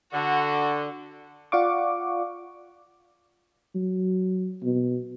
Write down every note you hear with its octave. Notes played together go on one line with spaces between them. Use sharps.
D3 F#4
F4 D5 F5 F#5 C#6 D6
F#3
B2